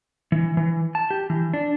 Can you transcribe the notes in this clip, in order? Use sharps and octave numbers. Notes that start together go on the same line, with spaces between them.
E3
E3
A5
G4
E3
D4